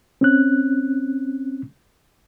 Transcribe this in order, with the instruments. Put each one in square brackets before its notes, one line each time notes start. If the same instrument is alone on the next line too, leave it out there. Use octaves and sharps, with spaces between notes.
[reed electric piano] C4 C#4 F#6